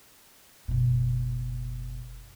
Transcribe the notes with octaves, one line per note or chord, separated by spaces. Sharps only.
F#1 B2